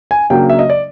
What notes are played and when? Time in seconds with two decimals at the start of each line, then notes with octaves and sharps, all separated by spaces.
0.11 G#5
0.30 C#3 F#3 A#3 D4 G5
0.50 E5
0.59 D#5
0.70 D5